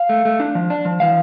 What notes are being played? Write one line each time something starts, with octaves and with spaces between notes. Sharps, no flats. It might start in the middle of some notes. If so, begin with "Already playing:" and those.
Already playing: F5
A3
A3
D4
F3
D4
F3
E3 F5